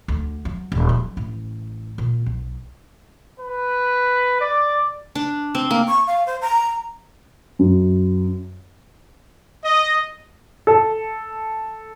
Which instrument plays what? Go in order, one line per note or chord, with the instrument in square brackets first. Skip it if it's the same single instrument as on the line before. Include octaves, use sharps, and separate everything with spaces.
[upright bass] D2
F#3
D#1
F#3
A1
A#2
B1
[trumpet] B4
D5
[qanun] D4
C4
A#3
[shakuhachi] C#6
F5
C5
A#5
[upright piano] F#2
[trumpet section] D#5
[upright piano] A4